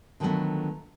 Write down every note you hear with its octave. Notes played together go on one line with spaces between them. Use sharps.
D3 D#3 F3 F#3 A3 B3